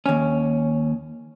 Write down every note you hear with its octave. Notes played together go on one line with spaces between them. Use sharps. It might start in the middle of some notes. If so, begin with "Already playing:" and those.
D#2 C#4